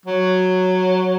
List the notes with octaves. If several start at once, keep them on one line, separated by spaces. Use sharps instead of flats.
F#3